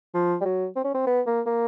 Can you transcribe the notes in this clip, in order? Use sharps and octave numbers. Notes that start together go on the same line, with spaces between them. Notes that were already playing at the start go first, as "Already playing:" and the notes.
F3
G3
F#3
C4
C#4
C4
B3
A#3
A#3